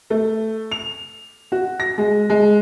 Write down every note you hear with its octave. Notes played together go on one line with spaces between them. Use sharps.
A3
F7
F#4
A#6
G#3
G#3